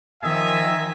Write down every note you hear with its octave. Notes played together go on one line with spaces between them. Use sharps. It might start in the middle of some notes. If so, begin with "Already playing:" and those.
D#3 F3 D#5 E5 G#5